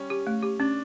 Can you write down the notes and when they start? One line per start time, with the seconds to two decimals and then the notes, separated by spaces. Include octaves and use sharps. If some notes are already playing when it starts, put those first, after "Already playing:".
Already playing: G3 C#4
0.10 G4
0.27 A3
0.43 G4
0.60 C#4 D4